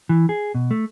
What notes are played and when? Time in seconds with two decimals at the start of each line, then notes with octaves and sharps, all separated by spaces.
0.09 E3
0.29 G#4
0.55 B2
0.71 A3